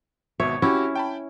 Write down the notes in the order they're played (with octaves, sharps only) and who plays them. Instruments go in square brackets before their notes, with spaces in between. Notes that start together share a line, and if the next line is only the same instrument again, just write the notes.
[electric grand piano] G#1 B2 E5 [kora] C#5
[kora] C#4 E4 [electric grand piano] F#4 G4
[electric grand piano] G5 A5 B5